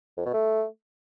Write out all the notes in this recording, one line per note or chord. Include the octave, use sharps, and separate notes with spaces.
F2
B2
A3